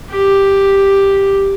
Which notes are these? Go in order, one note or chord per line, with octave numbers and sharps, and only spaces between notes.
G4